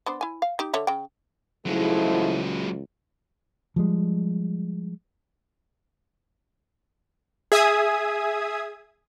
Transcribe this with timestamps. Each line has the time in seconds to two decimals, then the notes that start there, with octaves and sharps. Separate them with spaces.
0.06 B3 D4 C5
0.21 E4 G#5
0.42 F5
0.59 D#4 G4
0.73 D3 C#5 E5
0.87 C#3 G5
1.66 C#2 G#2 F3 F#3 G#3 A3 E4
3.76 F3 G3 G#3
7.52 G#4 E5 G#5 D#6 G#6